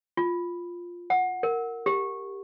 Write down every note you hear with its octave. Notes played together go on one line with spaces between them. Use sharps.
F4
F#5
A#4
G4